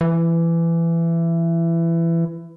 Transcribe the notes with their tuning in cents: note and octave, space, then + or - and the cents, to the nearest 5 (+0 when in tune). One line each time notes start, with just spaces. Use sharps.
E3 +20